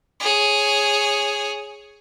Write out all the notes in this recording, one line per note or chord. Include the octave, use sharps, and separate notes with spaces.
G#4 C#5